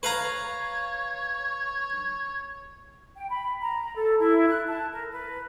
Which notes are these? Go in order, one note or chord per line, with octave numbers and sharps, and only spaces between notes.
B4 C#5 F5 A#5
G5
B5
A#5
A4
E4
F#6
A5
A#4
B4